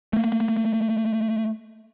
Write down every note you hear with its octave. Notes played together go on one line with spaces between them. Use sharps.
A3 A#3